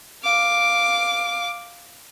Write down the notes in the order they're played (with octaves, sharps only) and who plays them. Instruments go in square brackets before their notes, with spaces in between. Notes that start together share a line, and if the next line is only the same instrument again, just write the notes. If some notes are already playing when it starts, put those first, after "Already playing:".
[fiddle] F5 D6